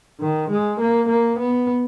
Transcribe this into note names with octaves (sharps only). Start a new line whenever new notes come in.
D#3
G#3
A#3
A#3
B3